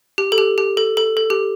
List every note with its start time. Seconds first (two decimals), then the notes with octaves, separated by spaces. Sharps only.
0.18 G4
0.32 A4
0.38 G4
0.58 G4
0.77 A4
0.97 A4
1.17 A4
1.30 G4